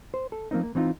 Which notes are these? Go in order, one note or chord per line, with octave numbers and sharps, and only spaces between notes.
C5
A4
F3 A#3 C4 D#4
A#3
E3 C4 D#4 F4